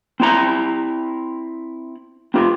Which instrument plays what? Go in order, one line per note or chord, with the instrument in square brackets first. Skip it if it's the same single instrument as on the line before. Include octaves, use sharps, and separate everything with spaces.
[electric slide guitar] C4 E4 A#5
C4 F4 G4